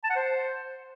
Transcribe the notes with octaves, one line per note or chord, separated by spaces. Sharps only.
A5
F#5
C5